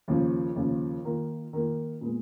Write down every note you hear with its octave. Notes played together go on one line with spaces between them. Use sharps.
D#2 C#3 F3
D#2 C#3 F3
D#3 A#3 F4
D#3 A#3 F4
A#2 G#3 B3